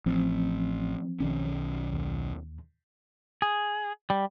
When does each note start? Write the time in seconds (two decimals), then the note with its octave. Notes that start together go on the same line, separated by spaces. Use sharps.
0.06 A1 F3 C4
1.20 B1 D#3 C#4
1.93 D#2
3.42 G#4
4.10 G3